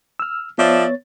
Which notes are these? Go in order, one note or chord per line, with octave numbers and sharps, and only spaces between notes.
E6 F6
F3 B3 C#5 D5 E5 A6